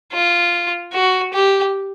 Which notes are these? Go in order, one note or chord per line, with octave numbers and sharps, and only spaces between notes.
F4
F#4
G4